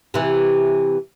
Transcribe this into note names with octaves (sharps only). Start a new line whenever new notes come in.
C3 E3